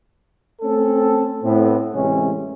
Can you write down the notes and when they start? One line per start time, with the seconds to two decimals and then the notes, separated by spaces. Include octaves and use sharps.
0.62 A3 C4 C#4 A4
1.43 A2 B3 C4
1.94 A1 C3 G#3 C#4